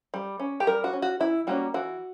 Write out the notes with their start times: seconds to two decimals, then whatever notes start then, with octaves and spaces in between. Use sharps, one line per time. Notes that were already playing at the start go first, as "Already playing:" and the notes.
0.14 G3
0.40 C#4
0.60 G4
0.67 G3 A#4
0.84 F#4
0.93 C#4
1.02 F#4
1.20 E3 E4
1.47 G3 A#3 C#4 F#4
1.74 E3 F#4